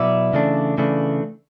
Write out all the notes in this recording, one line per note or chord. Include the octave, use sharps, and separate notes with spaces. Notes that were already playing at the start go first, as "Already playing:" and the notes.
Already playing: B2 F#3 B3 E4 D5 E5
C#3 E3 A3 D4
C#3 E3 A3 D4